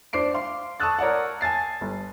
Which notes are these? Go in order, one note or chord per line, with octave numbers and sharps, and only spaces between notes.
D4 C5 D6 C7 D7
F5 C6
A5 C#6 D#6 E6 F#6 A6
A#4 C#5 D5 F#5
G#5 A5 A6 C7
G1